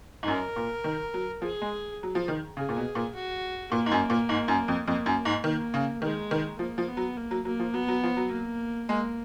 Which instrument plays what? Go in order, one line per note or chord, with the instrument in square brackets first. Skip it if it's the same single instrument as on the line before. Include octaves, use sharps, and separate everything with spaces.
[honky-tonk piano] G#2
[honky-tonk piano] F#2 [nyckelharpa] A#4
[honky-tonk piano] A#2
D#3
F#3
[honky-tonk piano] F3 [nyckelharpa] G#4
[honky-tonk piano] G#3
F#3
F3
D#3
[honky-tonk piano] C#3 [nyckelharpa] G#4
[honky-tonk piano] A#2
B2
A#2
[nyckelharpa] F#4
[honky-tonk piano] A#2 [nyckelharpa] A#3
[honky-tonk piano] G#2
F#2
A#2
G#2
F#2
F2
[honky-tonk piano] F2 [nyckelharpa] A#3
[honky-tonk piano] F#2
G#2
[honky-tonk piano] D#3 [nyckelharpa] A#3
[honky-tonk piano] C#3
[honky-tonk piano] D#3 [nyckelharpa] G#3
[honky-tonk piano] D#3
[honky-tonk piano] F3 [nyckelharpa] A#3
[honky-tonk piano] F3
[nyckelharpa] B3
[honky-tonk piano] F#3
[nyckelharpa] A#3
[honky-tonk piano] F#3
[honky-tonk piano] F#3 [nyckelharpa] A#3
[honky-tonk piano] F3
[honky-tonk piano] F#3 [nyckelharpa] B3
[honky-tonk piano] F#3
F3
F#3
[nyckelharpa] A#3
[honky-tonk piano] G#3 [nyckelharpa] A#3